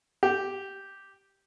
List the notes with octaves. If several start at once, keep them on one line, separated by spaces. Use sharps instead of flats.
G4